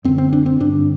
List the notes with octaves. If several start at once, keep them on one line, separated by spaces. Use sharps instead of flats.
F#2 D3 C4
C4
D4
C4
G2 D3 D4